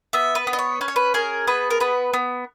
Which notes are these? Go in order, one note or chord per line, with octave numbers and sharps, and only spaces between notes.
B3 E5
B4
B3
D#5
C#5
C#4 B4
C#5
B4
G#4 A#4
B3 B4
A#4
B3 B4
B3